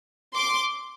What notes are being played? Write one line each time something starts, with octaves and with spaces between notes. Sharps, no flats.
C6 D6